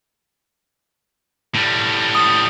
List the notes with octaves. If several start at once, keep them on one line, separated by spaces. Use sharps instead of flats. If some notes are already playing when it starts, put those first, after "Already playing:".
A2 G3
D#6